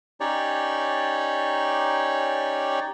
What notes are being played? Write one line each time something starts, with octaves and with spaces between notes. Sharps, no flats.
C#4 D#4 G4 C#5 D5